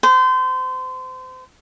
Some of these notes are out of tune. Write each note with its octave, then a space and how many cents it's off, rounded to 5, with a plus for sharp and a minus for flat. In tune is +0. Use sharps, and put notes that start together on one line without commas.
C5 -30